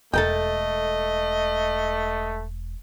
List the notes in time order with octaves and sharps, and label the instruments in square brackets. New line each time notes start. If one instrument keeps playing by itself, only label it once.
[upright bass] E1 [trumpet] A3 [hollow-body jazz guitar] A4 A#4 G5 [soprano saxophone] D#5